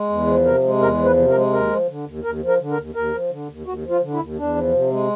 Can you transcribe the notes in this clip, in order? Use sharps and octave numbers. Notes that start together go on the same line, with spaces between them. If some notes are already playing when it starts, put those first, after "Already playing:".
Already playing: G#3
E2
F3
C3 A#4
G#3
E2 A#4
F3
B4
C3
A#4
G#3
D#2 A#4
F3
D3
D#2
D#2 A#4
F3
A#4
D3
A#4
D#2
D#2 A#4
F3
D3
D#2
D#2 F#4
F3
F4
D3
E4
D#2
E2 D4
F3
C3
G#3